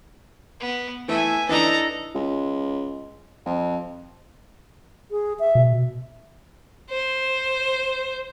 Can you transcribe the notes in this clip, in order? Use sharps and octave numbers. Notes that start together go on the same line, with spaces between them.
B3
E3 A3 E5 G#5
E3 D4 D#4 A4 A#5
C#2
F2
G#4
E5
B2
C5